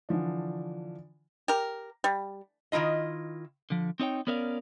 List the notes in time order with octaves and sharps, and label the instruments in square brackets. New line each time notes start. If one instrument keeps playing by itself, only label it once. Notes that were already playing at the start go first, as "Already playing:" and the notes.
[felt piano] D3 E3 F3 D4
[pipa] G4 A#4
G3
[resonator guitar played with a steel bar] D#3 A3 E4 F4 D#5
[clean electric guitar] D3 F3
C4 D#4 C#5 G5
B3 C#4 A#4 D5 E5 F5